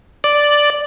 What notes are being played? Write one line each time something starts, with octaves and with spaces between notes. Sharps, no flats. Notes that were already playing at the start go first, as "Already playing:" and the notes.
D5